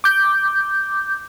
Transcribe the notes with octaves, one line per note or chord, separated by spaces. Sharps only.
D6 G6